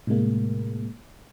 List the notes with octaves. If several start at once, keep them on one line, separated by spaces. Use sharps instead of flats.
A2 C3 G#3 A#3